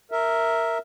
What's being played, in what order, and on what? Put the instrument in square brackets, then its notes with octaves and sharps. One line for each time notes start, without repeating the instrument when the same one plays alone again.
[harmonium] A#4 E5